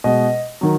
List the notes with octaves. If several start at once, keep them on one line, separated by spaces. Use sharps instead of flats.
B2 G#3 D#5
D#3 F#3